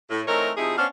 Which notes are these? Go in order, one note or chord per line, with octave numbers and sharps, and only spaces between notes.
A2
E3 A3 C4 D#4 A#4 C#5
C3 F3 D#4 E4 G#4
B3 C#4 D4 C5 F5